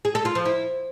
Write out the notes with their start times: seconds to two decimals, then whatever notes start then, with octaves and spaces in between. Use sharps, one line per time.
0.05 G#4
0.15 A4
0.25 F4
0.35 F3
0.46 E4